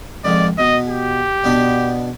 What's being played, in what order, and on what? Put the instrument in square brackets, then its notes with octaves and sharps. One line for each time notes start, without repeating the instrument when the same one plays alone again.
[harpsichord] F2 G#2 D#3 [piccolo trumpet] D5
[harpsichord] B2 [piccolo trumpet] D#5
[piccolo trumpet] G4
[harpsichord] B2 B3 D4